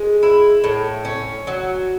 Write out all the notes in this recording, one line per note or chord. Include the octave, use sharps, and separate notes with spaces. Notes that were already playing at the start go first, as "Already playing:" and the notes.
Already playing: G#3
E4
A2
C#4
F#3